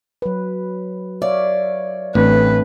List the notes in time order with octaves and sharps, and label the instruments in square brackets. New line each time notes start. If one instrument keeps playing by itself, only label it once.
[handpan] F#3 B4
[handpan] C#5 E5 F5 [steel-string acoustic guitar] D5
[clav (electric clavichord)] A1 [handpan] A3 C4 D4 [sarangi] B4